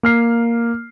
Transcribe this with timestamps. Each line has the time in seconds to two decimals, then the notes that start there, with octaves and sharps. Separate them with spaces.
0.03 A#3 F6 C7